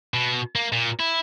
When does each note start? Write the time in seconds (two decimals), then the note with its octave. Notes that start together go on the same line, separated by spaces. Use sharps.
0.14 B2
0.55 A#3
0.72 A#2
1.00 E4